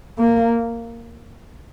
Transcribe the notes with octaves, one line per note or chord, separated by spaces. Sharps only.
A#3